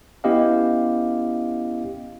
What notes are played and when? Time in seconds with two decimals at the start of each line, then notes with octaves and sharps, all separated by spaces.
0.24 B3 C#4 E4 G4 D#5 F5